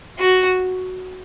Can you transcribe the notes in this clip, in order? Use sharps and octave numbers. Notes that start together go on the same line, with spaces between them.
F#4